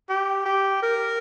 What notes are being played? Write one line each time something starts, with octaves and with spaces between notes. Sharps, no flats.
G4
G4
A#4